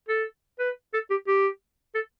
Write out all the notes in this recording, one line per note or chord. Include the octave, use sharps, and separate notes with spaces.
A4
B4
A4
G4
G4
A4